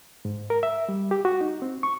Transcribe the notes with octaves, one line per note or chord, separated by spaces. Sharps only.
G#2
A#4
E5
G3
G4
F#4
D#4
C4
C#6